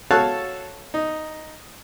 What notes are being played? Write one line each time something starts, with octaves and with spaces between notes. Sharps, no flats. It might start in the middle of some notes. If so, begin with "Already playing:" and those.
F#4 A4 C#5 F5 A5 F#6
D#4